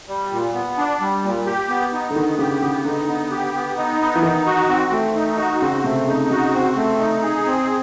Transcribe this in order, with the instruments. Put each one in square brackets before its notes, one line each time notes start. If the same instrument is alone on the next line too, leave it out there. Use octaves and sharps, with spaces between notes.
[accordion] G3
A#2
B3
D4
G3
A#2
G4
B3
D#4
[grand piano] D3
[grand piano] D#3 [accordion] B3
[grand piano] C#3 [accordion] G4
[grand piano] C#3 [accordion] B3
[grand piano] D3 [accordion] D#4
[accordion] B3
G4
B3
D#4
B3
[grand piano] E3
[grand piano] D#3 [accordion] D#4
[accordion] F#4
C4
A3
D#4
F#4
[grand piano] C#3 [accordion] C4
[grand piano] C3 [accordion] A3
[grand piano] C#3 [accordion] D#4
[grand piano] C#3 [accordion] F#4
[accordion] C4
A3
D#4
G#4
C4